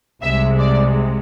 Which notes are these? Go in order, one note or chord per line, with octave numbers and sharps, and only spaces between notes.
C2 C3 G#3 E5
D5